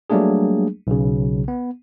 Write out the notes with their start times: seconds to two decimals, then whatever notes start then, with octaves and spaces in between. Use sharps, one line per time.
0.10 F#3 G3 A3 A#3 D4 G#4
0.87 B1 C#3
1.48 B3